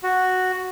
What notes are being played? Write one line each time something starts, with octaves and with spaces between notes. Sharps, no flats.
F#4